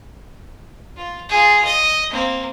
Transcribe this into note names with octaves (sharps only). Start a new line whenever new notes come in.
F4
F4 G#4
D#5
A#3 C4